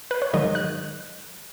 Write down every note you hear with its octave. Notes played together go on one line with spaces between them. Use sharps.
B4
C#5
G#2 D#3 F#3 D#4 D#5
F#6